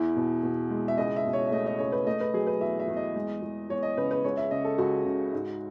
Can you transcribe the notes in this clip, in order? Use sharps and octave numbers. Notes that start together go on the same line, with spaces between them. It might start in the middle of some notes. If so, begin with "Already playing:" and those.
Already playing: E2 E4
B2
B2
G#3
E5
C#2 D#5
E5
B2
C#5
E5
A3 D#5
D#5
C#2 C#5
B4
A3 D#5
B4
F#3 G#4
B4
E2 E5
E5
E2
D#5
G#3
E2
E2 C#5
D#5
C#3 B4
B4
C#2 C#5
E5
C#3 D#5
A4
C#2 F#4
C#3
G#2